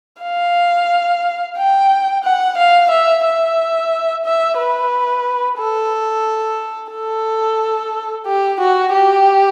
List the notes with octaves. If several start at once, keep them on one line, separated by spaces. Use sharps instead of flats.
F5
G5
F#5
F5
E5
E5
E5
B4
A4
A4
G4
F#4
G4